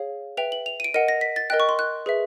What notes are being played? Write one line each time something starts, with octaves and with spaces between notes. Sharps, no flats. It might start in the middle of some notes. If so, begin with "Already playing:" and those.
Already playing: G#4 C#5 F5
B4 E5 G5 F7
F#7
F7
D#7
D7
A#4 D#5 F#5 D#7
A#6
B6
A6
A#4 D#5 G5 F#6
C#6
C6
F#6
G#4 B4 E5